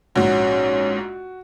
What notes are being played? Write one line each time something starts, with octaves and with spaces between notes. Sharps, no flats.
A#1 G#2 C#4 F#4